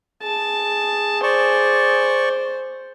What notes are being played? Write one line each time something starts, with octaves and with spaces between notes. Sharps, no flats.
G#4 A5
C5 D5 C#6